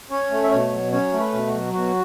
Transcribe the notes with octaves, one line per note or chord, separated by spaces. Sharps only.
C#4 C#5
A3
E5
B2 C#5
F#3
C#4 C#5
A3
B4
B2
F#4
F#3
B2 F#4